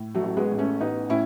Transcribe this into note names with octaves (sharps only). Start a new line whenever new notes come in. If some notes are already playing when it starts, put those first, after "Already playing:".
Already playing: A2
F#3 A3
A1
G#3 B3
A1
A3 C#4
A1 B3 D#4
A2 C#4 E4